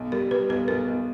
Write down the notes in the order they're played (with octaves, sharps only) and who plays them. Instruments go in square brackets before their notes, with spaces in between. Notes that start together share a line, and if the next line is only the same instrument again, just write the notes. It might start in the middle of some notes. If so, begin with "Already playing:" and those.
Already playing: [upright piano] B1
[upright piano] G3 [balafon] A#4
[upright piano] G3 [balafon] B4
[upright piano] B1 [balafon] B4
[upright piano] B1 [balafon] A#4
[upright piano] B1